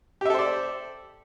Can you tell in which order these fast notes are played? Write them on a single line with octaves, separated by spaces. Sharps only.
G4 E5 A4 C5 D5